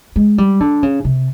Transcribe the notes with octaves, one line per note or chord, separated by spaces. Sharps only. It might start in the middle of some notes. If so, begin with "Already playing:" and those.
G#3
G3
D3
C#3
C3